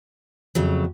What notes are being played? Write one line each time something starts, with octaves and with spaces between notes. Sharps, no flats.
F2 C#3 F#3 A3